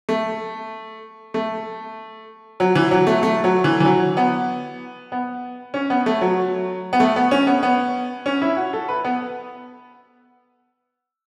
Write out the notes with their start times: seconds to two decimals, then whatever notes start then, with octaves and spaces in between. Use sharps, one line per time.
0.09 A3
1.34 A3
2.60 F#3
2.75 E3
2.91 F#3
3.07 A3
3.23 A3
3.44 F#3
3.64 E3
3.80 E3
3.85 F#3
4.17 B3
5.12 B3
5.74 C#4
5.90 B3
6.06 A3
6.21 F#3
6.93 B3
7.00 A3
7.16 B3
7.31 C#4
7.47 B3
7.63 B3
8.26 C#4
8.42 E4
8.57 F#4
8.73 A4
8.89 B4
9.05 B3